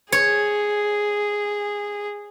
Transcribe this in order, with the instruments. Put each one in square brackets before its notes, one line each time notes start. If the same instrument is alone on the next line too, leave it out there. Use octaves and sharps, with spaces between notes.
[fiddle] G#4 [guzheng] C#5